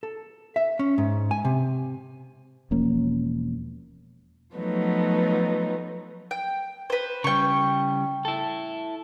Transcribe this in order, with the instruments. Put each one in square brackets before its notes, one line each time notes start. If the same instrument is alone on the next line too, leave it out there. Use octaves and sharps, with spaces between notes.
[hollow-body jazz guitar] A4
E5
C#4
G#2
G#5
C3
[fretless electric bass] E1 F3 A#3 C#4
[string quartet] F3 F#3 A3 B3 D#4
[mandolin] G5
B4 C5
[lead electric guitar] C#3 G3 [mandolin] G5 C#6
[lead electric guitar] E4 A4